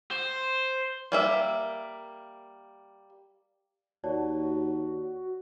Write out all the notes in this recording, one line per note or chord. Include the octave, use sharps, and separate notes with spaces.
C5
G3 A#3 E5
D#2 F#4 C#5 D5 A5